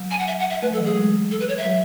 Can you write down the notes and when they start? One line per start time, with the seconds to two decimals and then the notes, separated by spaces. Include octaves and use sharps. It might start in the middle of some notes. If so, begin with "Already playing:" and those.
Already playing: F#3
0.11 G#5
0.19 F#5
0.27 E5
0.39 F#5
0.50 E5
0.62 A3 B4
0.71 F#3 A4
0.79 E3
0.85 F#3 G#4
0.97 G#3
1.31 A4
1.40 B4
1.48 C#5
1.58 E5
1.65 F#3